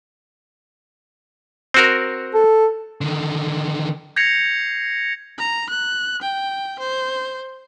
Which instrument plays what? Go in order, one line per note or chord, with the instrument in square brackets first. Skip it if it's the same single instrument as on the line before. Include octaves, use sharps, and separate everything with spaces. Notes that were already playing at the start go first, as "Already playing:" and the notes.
[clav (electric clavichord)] C4 F#4 A#4
[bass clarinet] A4
[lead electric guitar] D3 D#3
[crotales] G6 G#6 A#6 C7 C#7 F7
[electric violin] A#5
F#6
G5
C5